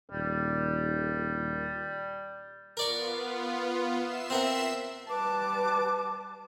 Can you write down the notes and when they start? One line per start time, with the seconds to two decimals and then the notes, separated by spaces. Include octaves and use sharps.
0.12 D#1 G3
2.77 B3 F4 A#4 D5 C#6
3.97 E5 C7 E7
4.30 C4 A#4 F#5
5.09 G3 B4 A5 D6